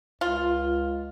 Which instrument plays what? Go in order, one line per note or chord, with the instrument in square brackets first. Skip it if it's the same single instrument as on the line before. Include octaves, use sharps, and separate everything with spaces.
[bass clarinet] C#2 [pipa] F4